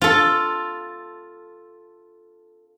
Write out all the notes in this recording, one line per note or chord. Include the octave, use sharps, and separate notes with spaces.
F4 A4